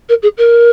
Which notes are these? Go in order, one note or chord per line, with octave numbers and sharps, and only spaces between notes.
A#4
G#4
A#4